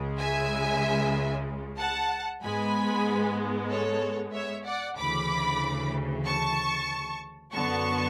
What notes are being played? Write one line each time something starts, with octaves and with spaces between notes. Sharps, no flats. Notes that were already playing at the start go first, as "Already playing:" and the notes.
Already playing: C#2 C#3 G#3
E5 G#5
F#5 A5
G#2 G#3 B3 G#5 B5
A4 C#5
C#5 E5
D5 F#5
D2 C#3 E3 B5 D6
A5 C#6
F#2 D3 F#3 B3 A5 C#6